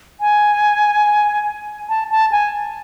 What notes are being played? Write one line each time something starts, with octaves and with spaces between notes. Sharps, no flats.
G#5
A5
A5
G#5